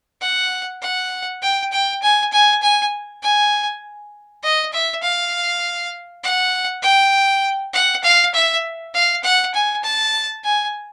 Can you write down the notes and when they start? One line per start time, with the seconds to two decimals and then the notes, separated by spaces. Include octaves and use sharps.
0.21 F#5
0.82 F#5
1.42 G5
1.72 G5
2.02 G#5
2.32 G#5
2.62 G#5
3.22 G#5
4.43 D#5
4.73 E5
5.03 F5
6.23 F#5
6.83 G5
7.73 F#5
8.03 F5
8.34 E5
8.94 F5
9.24 F#5
9.54 G#5
9.83 A5
10.44 G#5